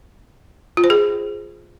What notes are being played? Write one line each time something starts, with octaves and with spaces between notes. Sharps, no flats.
F4
C5
G#4